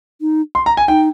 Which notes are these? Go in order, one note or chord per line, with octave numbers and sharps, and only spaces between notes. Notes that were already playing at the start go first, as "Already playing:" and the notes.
D#4
C6
A#5
G#5
D#4 G5